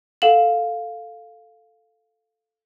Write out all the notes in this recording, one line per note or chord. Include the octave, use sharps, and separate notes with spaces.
A4 F5 F#5 E7 F#7